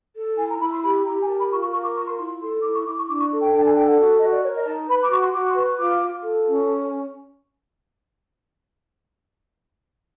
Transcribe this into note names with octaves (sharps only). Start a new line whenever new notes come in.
A4
E4 G#5
A#5
E4 B5
C6
G4 B5
G4 A#5
G#5
A#4 A5
B5
F4 C#6
C#6
A#4 C#6
D6
F4 C#6
C6
E4 C6
A4 C6
E4 D6
C#6
E4 D6
C#6
D4 D6
C#6
A4
G5
D4 G5
A5
G#5
A4 G5
F#5
F#4
F#4 D#5
D5
A#4 C#5
D#5
D#4 A5
B4 B5
D6
F#4 C#6
C6
F#4 D6
C6
B4 C#6
F4 D6
F4
A4
C#4